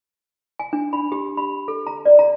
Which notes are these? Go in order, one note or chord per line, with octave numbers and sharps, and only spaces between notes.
G#5
D4
B5
G4
B5
A4
A#5
D5
A#5